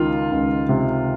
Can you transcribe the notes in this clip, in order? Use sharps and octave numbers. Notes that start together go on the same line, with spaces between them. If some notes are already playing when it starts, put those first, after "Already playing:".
Already playing: C#2 D#3 F4
C#2
C3